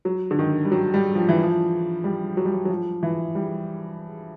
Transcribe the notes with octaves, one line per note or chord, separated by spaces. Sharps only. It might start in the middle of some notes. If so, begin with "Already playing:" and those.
F#3
D3
D#3
G3
F#3
G3
F3
E3
F3
G3
F#3
G3
F#3
F#3
F3
E3
G3